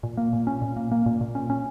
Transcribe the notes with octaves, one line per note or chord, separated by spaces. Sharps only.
A#2
A#3
A#2
C#4
A#2
A#3
A#3
A#2
A#2
C#4
C#4